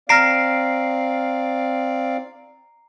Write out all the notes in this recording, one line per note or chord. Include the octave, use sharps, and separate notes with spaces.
C4 D5 F5 A#5 F6 A#6 C7 D7